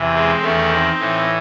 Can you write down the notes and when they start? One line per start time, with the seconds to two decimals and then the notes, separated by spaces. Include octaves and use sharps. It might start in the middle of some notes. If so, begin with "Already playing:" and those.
Already playing: E2 C3 E3
0.14 G#3 C4
0.42 E2 D#3 A3 C#4
0.71 C4 D#4
0.99 A2 E3